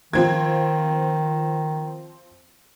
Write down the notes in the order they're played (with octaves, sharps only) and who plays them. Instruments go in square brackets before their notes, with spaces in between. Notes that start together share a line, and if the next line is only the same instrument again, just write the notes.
[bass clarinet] D#3 [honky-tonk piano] F3 C4 G#6